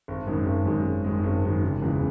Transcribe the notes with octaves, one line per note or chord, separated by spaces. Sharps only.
G#1
F#2 D#3 G#3
G#1
F#2 D#3 G#3
G#1
F#2 D#3 G#3
G#1
F#2 D#3 G#3
F#1
E2 C#3 E3 G#3